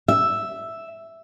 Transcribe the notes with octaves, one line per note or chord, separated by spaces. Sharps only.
E5